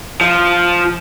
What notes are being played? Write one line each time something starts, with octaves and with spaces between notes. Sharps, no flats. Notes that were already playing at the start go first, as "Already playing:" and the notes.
F3